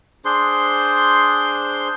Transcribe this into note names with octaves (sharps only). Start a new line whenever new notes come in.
D4 G#4 C5 C6